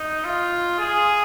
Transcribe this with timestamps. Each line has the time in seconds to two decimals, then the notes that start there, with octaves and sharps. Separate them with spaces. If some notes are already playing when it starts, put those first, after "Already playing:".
Already playing: D#4
0.25 F4
0.79 G#4